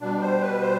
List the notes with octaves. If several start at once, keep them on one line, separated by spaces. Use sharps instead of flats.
B2 G3 D4
C5
B4
C5